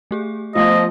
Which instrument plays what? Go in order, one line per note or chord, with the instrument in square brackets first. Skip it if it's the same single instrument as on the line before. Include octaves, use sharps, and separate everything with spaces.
[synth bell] A3 G4 G#4
[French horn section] F3 [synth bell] A3 B3 F4 [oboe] D#5